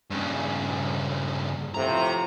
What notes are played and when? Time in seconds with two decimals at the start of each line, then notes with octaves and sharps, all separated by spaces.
0.11 G2 C#3
1.74 A2 C3 F3 A#5